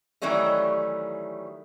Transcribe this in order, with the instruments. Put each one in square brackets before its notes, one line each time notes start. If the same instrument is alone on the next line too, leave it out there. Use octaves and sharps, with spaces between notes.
[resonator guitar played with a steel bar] D#3 E3 F#3 G3 A3 C#4